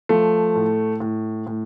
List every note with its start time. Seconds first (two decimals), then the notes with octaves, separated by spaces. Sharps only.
0.09 F3 A3
0.55 A2
1.00 A2
1.47 A2